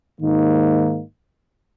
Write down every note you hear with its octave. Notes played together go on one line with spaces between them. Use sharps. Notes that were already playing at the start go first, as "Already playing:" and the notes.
G#2 D#3 A#3 D#4